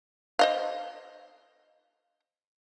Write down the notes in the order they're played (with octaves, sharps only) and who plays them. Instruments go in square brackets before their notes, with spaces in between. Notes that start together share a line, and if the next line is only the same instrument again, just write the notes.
[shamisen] C5 D#5 F5